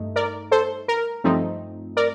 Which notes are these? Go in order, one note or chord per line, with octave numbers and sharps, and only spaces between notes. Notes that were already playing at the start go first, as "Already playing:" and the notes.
Already playing: G2 A3 D#4
A#4 D5
A4 C5
A#4
G2 F3 A3 C4 D#4
A#4 D5